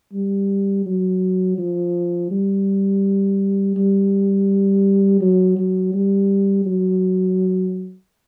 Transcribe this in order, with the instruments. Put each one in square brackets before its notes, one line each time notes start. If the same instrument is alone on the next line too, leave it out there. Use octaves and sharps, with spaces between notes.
[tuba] G3
F#3
F3
G3
G3
F#3
F#3
G3
F#3